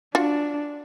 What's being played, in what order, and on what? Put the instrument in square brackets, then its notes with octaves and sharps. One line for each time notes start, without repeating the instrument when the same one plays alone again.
[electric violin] D4 [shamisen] F4 F#4